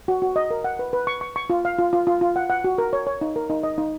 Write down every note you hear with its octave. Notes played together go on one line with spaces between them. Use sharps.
F#4
F#4
D#5
A#4
F#5
B4
B4
C#6
C#6
C#6
F4
F5
F4
F4
F4
F4
F#5
F#5
F#4
A#4
C#5
C#5
D#4
A#4
D#4
D#5
D#4